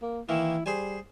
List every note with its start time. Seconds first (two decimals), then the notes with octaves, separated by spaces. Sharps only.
0.02 A#3
0.29 D#3 E3 A#3 E4
0.66 G3 G#4 C5 G#5